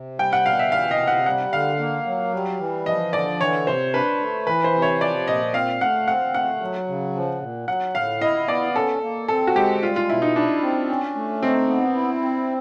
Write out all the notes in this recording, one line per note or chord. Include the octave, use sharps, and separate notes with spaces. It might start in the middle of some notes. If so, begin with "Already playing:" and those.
Already playing: C3
G3 G5
F#5
B2 F5
E5
E3 F5
D#5
C3
F#5
G3 F#5
D3 F5
A#3
F#3
G3
E3
F3 D#5
D3 D5
E3 C#5
C3 C5
D4 B4
A3
E3 B4
C5
C3
C#5
F3 D5
A#2 D#5
C4 F5
A3 F#5
C4 F#5
A3 F#5
F#3
C#3
F3
A#2
F#3 F#5
A2 F5
E4 D#5
B3 D5
C#4 A4
A#3
C4 A4
F#4
G#3 G4
G3 F4
F4
B2 E4
D#4
D4 E4
C4
C#4
A3
C4 D#4
B3
E4
C4